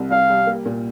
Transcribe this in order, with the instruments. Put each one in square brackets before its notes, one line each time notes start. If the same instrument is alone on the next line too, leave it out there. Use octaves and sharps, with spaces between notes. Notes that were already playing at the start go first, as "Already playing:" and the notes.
Already playing: [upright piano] C2 C3
[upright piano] C2 [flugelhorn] F5
[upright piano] G3
A#3
A#2